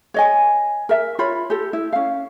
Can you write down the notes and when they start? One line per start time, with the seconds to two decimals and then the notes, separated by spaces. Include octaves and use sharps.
0.14 C#5 D#5 G#5
0.89 A#4 E5
1.19 F4 C#5 B5
1.50 G4 A4
1.73 E4
1.93 C#4 F5